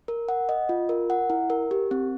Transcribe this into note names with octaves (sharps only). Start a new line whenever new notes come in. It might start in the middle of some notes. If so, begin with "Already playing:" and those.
A#4
F#5
D#5
F4
A#4
F#5
E4
A#4
G4
C4